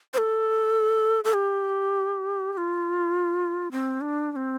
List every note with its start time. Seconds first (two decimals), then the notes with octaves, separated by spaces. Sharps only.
0.14 C5
0.18 A4
1.24 A4
1.34 G4
2.53 G4
2.57 F4
3.72 C4
4.01 D4
4.32 D4
4.36 C4